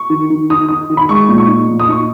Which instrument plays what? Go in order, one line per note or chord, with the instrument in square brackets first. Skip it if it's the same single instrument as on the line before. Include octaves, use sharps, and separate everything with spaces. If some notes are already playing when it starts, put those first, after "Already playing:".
Already playing: [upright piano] C#6
D#3
D#3
D#3 D#6
D#4 D#6
D#3
B5
G#3 C#6
A#2
C#6
D#4
A#2
D#6
D#4 C#6